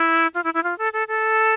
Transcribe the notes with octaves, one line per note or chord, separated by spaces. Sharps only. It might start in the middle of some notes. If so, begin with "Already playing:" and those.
Already playing: E4
F4
E4
E4
F4
A4
A4
A4